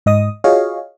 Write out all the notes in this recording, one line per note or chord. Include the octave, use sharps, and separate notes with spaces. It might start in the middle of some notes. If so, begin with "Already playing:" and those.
G#2 D#5 D#6
F4 F#4 G#4 C#5 D#5 F5